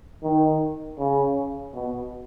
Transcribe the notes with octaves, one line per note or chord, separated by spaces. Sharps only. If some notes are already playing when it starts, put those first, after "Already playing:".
D#3
C#3
B2